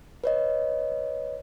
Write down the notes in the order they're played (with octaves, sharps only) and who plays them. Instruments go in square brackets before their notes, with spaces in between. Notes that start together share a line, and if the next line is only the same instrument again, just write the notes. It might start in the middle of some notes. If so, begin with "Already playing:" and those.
[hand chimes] B4 C#5 D#5